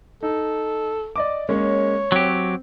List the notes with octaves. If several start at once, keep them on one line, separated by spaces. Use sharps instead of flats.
D#4 A4
D5 D#5 D6
G#3 A#3 C#4 C#5
F#3 C4 G4